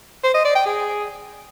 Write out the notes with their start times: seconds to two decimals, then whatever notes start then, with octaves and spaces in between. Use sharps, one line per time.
0.23 C5
0.34 D#5
0.45 D5
0.55 G5
0.66 G#4